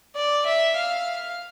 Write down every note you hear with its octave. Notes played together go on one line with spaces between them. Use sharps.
D5
E5
F5